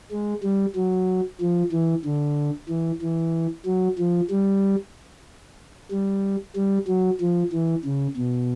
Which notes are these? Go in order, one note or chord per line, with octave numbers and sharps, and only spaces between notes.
G#3
G3
F#3
F3
E3
D3
E3
E3
F#3
F3
G3
G3
G3
F#3
F3
E3
C#3
B2